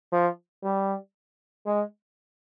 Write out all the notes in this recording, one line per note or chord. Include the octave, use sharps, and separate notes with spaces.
F3
G3
G#3